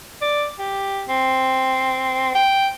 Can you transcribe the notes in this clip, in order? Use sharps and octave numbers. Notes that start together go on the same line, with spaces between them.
D5
G4
C4
G5